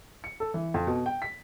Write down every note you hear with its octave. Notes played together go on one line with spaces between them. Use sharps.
C#7
A4
E3
F2
B2
G5
B6